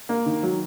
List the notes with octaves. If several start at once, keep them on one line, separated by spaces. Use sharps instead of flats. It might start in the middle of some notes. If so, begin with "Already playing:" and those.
A#3
D#3
F#3